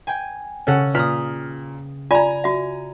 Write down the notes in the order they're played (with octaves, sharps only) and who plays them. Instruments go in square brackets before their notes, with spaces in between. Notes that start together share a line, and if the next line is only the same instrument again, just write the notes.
[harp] G5 G#5
[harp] C#3 [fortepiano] C#4 A4 F#5
[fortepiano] A#2 F6 [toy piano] B4 [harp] D#6 B6
[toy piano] F4 D5 B5 [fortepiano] G#5 A#5
[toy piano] F#4 E5